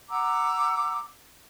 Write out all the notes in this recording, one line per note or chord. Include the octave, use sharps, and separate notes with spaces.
F#5 A#5 D6 E6